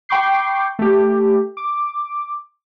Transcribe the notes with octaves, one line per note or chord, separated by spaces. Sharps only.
G5 B5 C#6 D6 G6 C7
A3 G4
D6